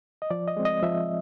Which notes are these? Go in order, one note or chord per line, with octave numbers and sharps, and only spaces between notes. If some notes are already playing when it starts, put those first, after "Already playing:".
D#5
F3 D5
D#5
G#3 C4
D#5
F3 E5